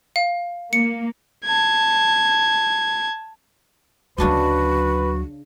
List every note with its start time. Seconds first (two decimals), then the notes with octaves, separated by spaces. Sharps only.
0.16 F5
0.73 A#3 C#7
1.45 A5 G#6
4.18 D2 C#3 F#3 D4 F#4 B4 D#5